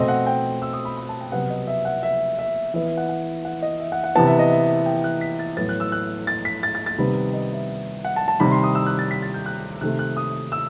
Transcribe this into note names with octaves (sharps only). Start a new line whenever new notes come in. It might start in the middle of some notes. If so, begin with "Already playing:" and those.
Already playing: B2 A3 C4 D#5
F#5
G5
E6
D#6
B5
B5
A5
G5
C3 F#3 B3 F#5
D#5
E5
F#5
E5
E5
E3 B3 E5
E5
F#5
F#5
F#5
D#5
E5
F#5
F#5
C3 E3 B3 A5
E5
D#5
E5
G5
F#6
B6
A6
A2 F#3 B3 A6
F#6
E6
F#6
A6
B6
A6
A6
A6
C3 D#3 G3 B3 B5
D#5
E5
F#5
A5
A5
C3 D#3 G3 B5
C6
D#6
E6
F#6
A6
B6
A6
G6
F#6
C3 D#3 A3 F#6
F#6
D#6
E6